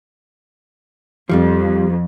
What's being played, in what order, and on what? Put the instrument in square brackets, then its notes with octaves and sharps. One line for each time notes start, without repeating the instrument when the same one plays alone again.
[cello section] F2 [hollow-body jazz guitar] F3 G3 F4